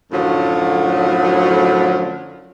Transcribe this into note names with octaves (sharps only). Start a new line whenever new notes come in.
F#2 A2 D3 F3 F#3